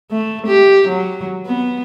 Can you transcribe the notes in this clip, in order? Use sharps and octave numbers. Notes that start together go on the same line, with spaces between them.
A3
G4
F#3
B3